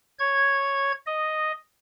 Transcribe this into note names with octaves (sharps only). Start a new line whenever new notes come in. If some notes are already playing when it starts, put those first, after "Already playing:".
C#5 G#6
D#5